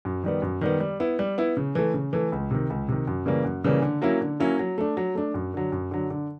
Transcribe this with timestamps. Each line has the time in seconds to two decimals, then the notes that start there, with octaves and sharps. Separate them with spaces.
0.05 F#2
0.24 D#3 G3 B3
0.42 F#2
0.61 D#3 G3 B3
0.80 G3
1.00 B3 E4
1.19 G3
1.38 B3 E4
1.57 C#3
1.75 E3 A3
1.94 C#3
2.13 E3 A3
2.32 C#2
2.51 C3 D#3
2.70 C#2
2.88 C3 D#3
3.07 F#2
3.26 C#3 E3 G3 A#3
3.45 F#2
3.64 C#3 E3 G3 A#3
3.82 D3
4.02 F#3 A#3 C#4 E4
4.21 D3
4.40 F#3 A#3 C#4 E4
4.59 F#3
4.78 A3 D4
4.97 F#3
5.15 A3 D4
5.34 F#2
5.54 D3 F#3
5.72 F#2
5.91 D3 F#3
6.10 D3